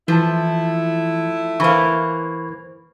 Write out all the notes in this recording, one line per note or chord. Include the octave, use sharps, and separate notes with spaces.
E3 F3 A3 E4 A5
E3 A#3 C5 B5 C#6